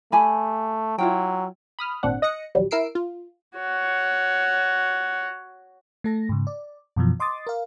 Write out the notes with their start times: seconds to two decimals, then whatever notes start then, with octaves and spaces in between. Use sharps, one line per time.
0.12 A3 G4 G#5 B5
0.98 F#3 E4 F4 G5
1.79 B5 D#6 F6
2.03 G#1 A#2 C4 D4 F#5
2.22 D#5 D#6 F#6 A#6 C#7
2.55 A#1 D#2 F#3 G3
2.71 E4 A#4 E6 C7 D7
2.95 F4
3.57 F#4 C#5
6.04 A3 A4 A#6
6.29 G#2 C#3
6.47 D5
6.96 F#2 B2 E3 F3
7.20 D#5 C6 D6 D#6 A6
7.47 A#4 F5